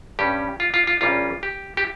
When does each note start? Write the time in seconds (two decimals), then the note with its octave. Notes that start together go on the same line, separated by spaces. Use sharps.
0.19 G2 G3 C#4 G4
0.60 F4
0.74 F4
0.87 F4
1.01 A#1 A#2 G3 C#4 F4
1.43 G4
1.77 G4